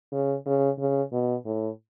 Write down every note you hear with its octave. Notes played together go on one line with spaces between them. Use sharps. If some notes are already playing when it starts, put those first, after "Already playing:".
C#3
C#3
C#3
B2
A2